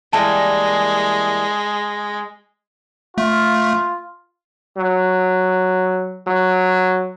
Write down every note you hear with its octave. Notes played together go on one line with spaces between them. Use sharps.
E3 G3 G#3 A#3 A5
A3 F4
F#3
F#3